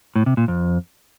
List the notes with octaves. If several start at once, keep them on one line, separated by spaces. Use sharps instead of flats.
A2
C3
A#2
F2